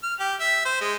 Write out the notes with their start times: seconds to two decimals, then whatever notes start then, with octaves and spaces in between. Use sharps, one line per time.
0.03 F6
0.20 G4
0.40 E5
0.65 C5
0.81 G#3